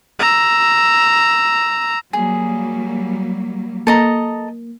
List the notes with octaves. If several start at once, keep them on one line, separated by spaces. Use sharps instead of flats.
A#5 E6
F#3 G3 A#3 G#4
A#3 A4 D#5 A#5